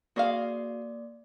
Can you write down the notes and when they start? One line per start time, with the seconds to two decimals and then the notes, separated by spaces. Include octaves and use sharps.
0.16 A#3 F#4 G#4 D5 F5